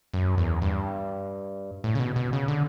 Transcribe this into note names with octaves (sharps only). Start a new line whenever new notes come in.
F#2
E2
G2
A2
C#3
B2
B2
C#3
D3